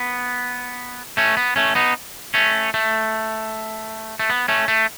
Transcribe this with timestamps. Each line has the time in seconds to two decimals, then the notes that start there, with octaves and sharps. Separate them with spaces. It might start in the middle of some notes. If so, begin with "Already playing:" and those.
Already playing: B3
1.17 A3 C#4
1.37 B3
1.56 A3 C#4
1.75 B3 D#4
2.34 A3 C#4
2.74 A3
4.20 A3
4.30 B3
4.48 A3 C#4
4.68 A3